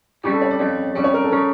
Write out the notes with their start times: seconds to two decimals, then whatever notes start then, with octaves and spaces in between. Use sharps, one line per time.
0.24 F2 C#3 G3 G4
0.33 A4
0.42 C#5
0.51 D5
0.60 F2 C#3 G3
0.95 F2 C#3 G3 D5
1.04 C#5
1.14 A#4
1.23 A4
1.32 C#3 G3 A#4